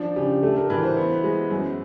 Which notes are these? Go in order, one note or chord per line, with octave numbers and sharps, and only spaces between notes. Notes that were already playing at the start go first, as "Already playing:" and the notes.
Already playing: F3 D4
C#3 G4
A3 A4
A#4
E3 B4
C5
B3
G#3
F#2